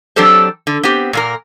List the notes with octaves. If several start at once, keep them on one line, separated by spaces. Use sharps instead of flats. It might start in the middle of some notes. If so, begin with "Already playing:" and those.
F#3 C4 D4 G4 A4 C5
D3
B3 C4 G4
A#2 A#3 A#4